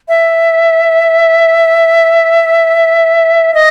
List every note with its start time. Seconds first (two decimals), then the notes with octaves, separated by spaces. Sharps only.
0.08 E5
3.54 D#5